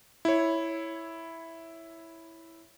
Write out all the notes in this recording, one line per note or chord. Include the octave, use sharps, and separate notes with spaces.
E4 C#5